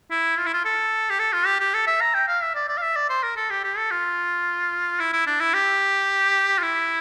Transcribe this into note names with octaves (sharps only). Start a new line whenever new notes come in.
E4
F4
E4
F4
A4
G4
A4
F4
G4
G4
A4
E5
A#5
G5
F5
E5
D5
D5
F5
E5
D5
C5
A#4
A4
G4
G4
A4
F4
E4
E4
D4
E4
G4
F4
E4